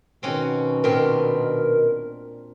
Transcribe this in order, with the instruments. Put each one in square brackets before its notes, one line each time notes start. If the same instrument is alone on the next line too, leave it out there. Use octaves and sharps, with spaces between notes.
[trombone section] B2 D#3 [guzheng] C4 C#4 F#4
[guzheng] A#2 C4 D4 [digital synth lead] A#4